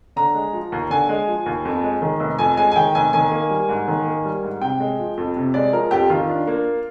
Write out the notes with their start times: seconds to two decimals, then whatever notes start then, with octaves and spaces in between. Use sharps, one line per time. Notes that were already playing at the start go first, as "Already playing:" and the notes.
0.16 D3 A#5
0.35 G#3
0.53 F3
0.72 D#2
0.90 D3 G#5
1.09 G#3
1.28 F3
1.46 D#2
1.65 F2
1.83 G#3
2.02 D#3
2.20 F1
2.39 F2 G#5
2.57 G#3 G#5
2.72 G#5
2.76 D#3 G5
2.95 F1 G#5
3.13 D#3 G#5
3.32 A#3
3.50 G3
3.69 G#2
3.88 D#3
4.06 A#3
4.25 G3
4.43 G#2
4.61 C3 G5
4.80 G#3
4.99 F3
5.17 F2
5.36 C3
5.54 G#3 D5
5.73 F3 A#4
5.91 F2 G4
6.10 D#3 F4
6.29 D4
6.47 A#3